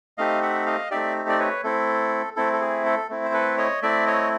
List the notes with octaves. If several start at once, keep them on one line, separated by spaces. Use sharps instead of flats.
A3 C4 D#4 G4 D#5 F5
E5 F#5
D#5 F5
A3 C4 D#4 G4 D5 E5
D5
B4 C#5
A3 C4 E4 A4
A3 C4 E4 A4
A4
G#4
A4
A3 C4 E4
C5
A4 B4
C#5 D#5
A3 C4 E4 D5 E5
C#5 D#5